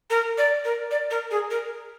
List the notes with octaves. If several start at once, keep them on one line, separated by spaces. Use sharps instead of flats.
A#4
D5
A#4
D5
A#4
G#4
A#4